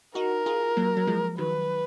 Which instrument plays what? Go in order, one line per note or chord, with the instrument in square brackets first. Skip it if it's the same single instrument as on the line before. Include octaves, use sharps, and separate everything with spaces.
[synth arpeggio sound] D#4 F#4 [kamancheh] A#4
[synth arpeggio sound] F4 G#4
F#3 A#3
F#3
F3 G#3
[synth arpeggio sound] D#3 F#3 [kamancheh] B4